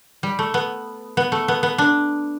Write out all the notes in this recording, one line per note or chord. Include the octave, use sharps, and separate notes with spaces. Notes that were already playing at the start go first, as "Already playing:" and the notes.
G3
A3
B3
B3
A3
B3
B3
D4